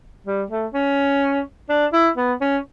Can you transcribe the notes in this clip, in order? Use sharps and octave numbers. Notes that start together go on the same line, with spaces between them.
G3
A3
C#4
D4
E4
B3
C#4